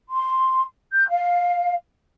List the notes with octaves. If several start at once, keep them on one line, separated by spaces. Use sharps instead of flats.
C6
G6
F5